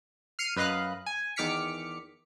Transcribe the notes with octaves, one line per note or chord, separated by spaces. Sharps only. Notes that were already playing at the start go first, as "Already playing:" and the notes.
F6 C7 C#7 D#7
F#2 B4 D#5 F5 F#6
G#5
E2 D#3 D6 F6 B6 C#7